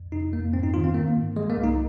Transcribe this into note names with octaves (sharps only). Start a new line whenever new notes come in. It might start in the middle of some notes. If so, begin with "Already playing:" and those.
Already playing: F2
C3 D#4
F2 A#3
G#2 C4
D#4
D#3 F4
C4
D#3 A#3
G#2
F3 G#3
A#3
C2
D#4